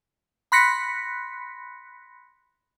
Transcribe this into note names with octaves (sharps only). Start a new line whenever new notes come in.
B5 C6 F#6 A#6 B6 C#7